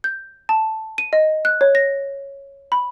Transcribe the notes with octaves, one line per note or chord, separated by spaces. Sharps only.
G6
A5
D#7
D#5
F#6
C#5
A#6
B5